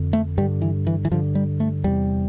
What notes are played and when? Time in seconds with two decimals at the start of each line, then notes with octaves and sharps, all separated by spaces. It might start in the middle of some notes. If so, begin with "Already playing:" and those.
Already playing: F2 D3
0.13 A3
0.37 G2 G3
0.41 D3
0.62 E3
0.87 E3
1.05 E3
1.11 G2 D3 F3
1.35 G3
1.60 A3
1.84 E2 C3 G3